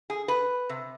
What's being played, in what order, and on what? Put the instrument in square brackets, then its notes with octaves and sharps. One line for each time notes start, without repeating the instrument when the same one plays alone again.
[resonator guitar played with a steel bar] G#4
B4
C3